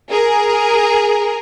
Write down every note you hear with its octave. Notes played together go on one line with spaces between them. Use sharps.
G#4 A#4